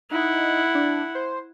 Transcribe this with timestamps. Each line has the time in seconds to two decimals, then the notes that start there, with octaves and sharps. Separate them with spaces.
0.11 D#4 E4 F#5
0.75 D4
1.15 C5